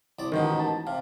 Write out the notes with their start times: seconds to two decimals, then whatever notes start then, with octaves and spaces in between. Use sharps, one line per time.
0.19 C2 D5
0.32 A1 G#2 B2 D#3 D#4
0.60 A5
0.87 C3 F5